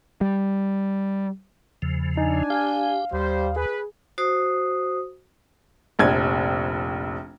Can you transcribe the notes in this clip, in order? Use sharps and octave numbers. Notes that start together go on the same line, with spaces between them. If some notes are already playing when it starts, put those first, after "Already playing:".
G3
E2 C#3 F3
D4 D#4 G#5
G4 F5
D#2 G3 C5
G#4 B4
F#4 C5 D#6
F1 A#1 G#6